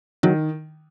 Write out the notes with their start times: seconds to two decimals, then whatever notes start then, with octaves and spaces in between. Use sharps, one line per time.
0.23 D#3 F#3